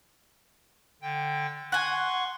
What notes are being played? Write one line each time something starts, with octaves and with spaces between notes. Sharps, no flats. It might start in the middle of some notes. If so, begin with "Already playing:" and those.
D3 G5
F#5 G#5 C6 C#6